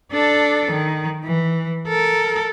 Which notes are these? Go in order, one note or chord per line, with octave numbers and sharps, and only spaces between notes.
D4 A4
D#3
E3
A4 A#4